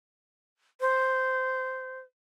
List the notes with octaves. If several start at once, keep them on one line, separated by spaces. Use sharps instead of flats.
C5